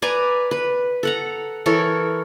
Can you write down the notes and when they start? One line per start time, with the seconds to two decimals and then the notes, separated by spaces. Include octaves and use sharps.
0.02 B4 D5 G#5 A#5
0.51 B4
1.03 A4 F#5 A#5
1.66 E3 A4 A#4 C#5